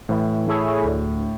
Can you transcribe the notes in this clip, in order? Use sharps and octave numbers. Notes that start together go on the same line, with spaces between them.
A2 E3
A3 E4 G#4 C#5
D2